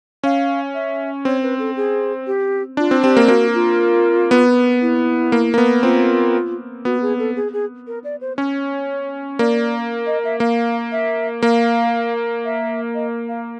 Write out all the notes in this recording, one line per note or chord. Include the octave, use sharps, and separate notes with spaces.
C#4 F5
E5
C4 C#5
B4
A4
G#4
G4
D4 F4
C4
C4 G4
A#3
A#3 F#4
F4
B3
E4
A#3
A#3
B3
C4 F4
B3 F#4
G#4
A4
G#4
G#4
A#4
D5
C5
C#4 C#5
A#3 D5
D#5
E5
A#3 F5
E5
A#3 F5
E5
D#5
F5